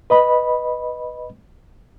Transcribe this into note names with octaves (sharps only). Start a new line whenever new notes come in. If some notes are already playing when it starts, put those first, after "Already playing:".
B4 D#5 B5